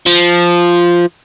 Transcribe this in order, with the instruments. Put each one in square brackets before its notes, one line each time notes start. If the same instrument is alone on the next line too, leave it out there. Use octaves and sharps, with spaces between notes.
[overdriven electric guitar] F3